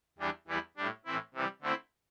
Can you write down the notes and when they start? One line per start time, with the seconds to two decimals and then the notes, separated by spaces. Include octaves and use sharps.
0.19 E2 E3 G3 D4
0.47 E2 E3 G3 E4
0.77 A2 G3 D4
1.05 A2 E3 C4 E4
1.34 C3 E3 G3
1.61 D3 A3 C4 E4